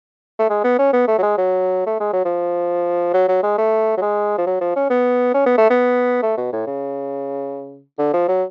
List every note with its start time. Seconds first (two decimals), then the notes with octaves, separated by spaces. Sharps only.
0.39 A3
0.50 G#3
0.64 B3
0.79 C#4
0.93 B3
1.08 A3
1.18 F#3
1.23 G#3
1.38 F#3
1.87 A3
2.00 G#3
2.13 F#3
2.25 F3
3.14 F#3
3.28 F#3
3.43 G#3
3.58 A3
3.97 F#3
4.02 G#3
4.38 F3
4.47 F#3
4.61 F3
4.76 C#4
4.90 B3
5.34 C#4
5.46 B3
5.58 A3
5.70 B3
6.22 A3
6.37 B2
6.53 A2
6.67 C#3
7.99 D3
8.13 F3
8.28 F#3